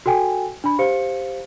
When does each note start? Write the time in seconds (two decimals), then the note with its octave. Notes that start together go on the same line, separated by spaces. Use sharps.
0.06 F#4 A4 G5 G#5
0.64 D4 B5
0.79 G4 C5 F5 C#7